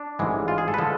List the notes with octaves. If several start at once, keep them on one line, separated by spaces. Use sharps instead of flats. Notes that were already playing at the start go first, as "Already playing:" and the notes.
Already playing: D4
A1 G#2 E3 G#3
F4
G#4
A4
B4
D3 F3 G#3 A4